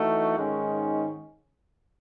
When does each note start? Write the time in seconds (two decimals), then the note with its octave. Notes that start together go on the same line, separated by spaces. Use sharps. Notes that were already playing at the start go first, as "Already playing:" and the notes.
Already playing: E3 A3 D#4 F#4
0.37 G#2 D#3 G#3 C#4